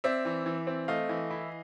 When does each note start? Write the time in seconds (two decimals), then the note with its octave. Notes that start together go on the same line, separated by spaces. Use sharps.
0.04 C4 D5 E5
0.25 E3
0.46 E3
0.67 C4
0.88 A3 D#5 F5
1.09 E3
1.31 E4